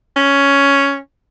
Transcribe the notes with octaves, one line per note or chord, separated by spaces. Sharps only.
C#4